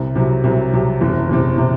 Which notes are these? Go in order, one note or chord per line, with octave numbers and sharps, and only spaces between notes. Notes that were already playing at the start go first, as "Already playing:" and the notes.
Already playing: C2 C3
C2 C3 F#3
C2 C3 F#3
C2 C3 F#3
F#1 E2 C3
F#1 E2 C3
C3